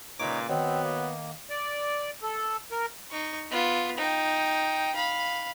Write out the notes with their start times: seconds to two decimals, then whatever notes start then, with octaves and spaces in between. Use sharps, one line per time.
0.20 C#2 A#2 D#4 B4 C#5 D6
0.49 D#3 F#3 B3 C4
0.83 A#3
1.50 D5
2.22 A4
2.72 A#4
3.11 D#4 C#6
3.51 B3 F4
3.97 D#4 G5
4.95 F5 B5